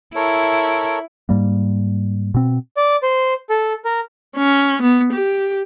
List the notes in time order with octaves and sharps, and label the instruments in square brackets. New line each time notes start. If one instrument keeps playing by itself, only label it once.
[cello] E4 [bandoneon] A4 A#4 C#5
[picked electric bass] G#2 G3 A#3
B2 C4
[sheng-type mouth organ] D5
C5
A4
A#4
[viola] C#4
B3
G4